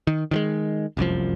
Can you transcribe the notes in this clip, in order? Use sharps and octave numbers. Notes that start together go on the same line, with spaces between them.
D#3
D#3 F3 G#3
F1 C2 F#2 F3